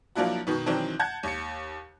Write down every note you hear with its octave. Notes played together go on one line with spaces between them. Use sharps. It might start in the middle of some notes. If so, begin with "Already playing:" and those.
F3 F#3 A#3 D4 E4 F#4
B2 D#3 B3
D#3 E3 F#3 C4 D4
F#5 A5 G6 G#6
D#2 C#7